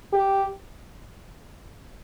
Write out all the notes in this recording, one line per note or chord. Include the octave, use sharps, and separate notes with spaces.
G4